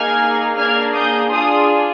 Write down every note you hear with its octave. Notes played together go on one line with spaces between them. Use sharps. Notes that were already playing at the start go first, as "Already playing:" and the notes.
Already playing: A#3 D#4 G#4 F6 G#6
A#3 D4 G#4 F6 G#6
D#6 G6
D4 F4 G#4 C6 D#6